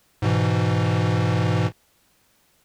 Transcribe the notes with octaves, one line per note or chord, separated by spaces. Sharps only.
G#2 B2 E3